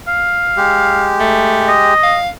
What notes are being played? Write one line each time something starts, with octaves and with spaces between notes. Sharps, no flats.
F5
G#3 G4
A3
D#5
F5